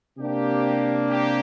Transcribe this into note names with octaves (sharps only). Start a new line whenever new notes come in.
C3 A#3 D4 G4
G4